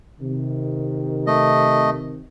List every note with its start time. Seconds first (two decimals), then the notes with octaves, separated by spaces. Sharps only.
0.20 C3 D#3
1.27 A3 D#5